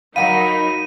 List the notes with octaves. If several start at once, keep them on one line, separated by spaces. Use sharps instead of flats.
F#3 D#4 A#4 F5 F#5 A#5 B5 D#7